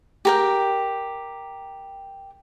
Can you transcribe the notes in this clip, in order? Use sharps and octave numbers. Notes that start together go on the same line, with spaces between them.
G4 A#4 G5